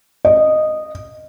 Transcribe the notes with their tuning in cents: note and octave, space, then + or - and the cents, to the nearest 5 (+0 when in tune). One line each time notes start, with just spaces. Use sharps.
D#5 -10